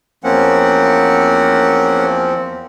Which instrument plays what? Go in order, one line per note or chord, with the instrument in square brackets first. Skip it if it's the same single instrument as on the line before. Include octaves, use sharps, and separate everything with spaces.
[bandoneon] E2 F3 C4 [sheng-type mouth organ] A#3 C#4 F#5